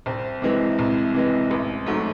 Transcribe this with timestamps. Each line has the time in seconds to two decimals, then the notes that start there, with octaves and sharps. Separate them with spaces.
0.06 C2 C4
0.42 C3 E3 G#3
0.79 C2
1.14 C3 E3 G#3
1.51 A1
1.86 G#2 F#3 A3